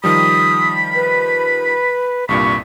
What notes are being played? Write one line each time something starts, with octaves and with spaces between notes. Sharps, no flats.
D#3 F3 G3 B5 D#6
B4
C2 G2 A#2 B5 C#6